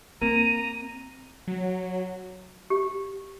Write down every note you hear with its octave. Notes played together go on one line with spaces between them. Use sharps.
A#3 C4 A#5 D#7
F#3
G4